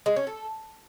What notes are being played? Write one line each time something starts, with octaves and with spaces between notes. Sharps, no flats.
G#3
C#4
A4